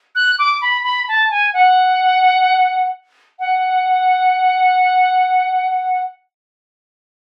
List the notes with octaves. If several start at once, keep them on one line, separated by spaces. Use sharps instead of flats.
F#6
D6
B5
B5
A5
G#5
F#5
F#5